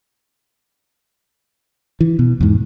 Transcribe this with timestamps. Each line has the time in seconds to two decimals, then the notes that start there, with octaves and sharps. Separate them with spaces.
2.01 E3
2.19 B2
2.41 E2 G#2